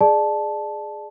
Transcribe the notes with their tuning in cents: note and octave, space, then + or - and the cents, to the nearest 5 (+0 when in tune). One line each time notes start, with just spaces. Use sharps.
G#4 +5 D5 +25 A5 -10